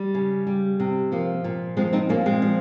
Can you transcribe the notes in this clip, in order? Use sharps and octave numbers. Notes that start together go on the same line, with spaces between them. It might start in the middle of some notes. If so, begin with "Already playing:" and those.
Already playing: G3
C#3
G3
C3
F3 A#3
A#2
F3 G#3 C4
C4 D#4
A#2 A#3 C#4
G#3 C4
F3